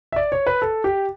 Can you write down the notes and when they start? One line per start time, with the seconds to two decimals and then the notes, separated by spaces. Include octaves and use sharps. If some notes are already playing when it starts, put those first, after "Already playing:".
0.12 E5
0.16 D5
0.32 C#5
0.47 B4
0.62 A4
0.84 G4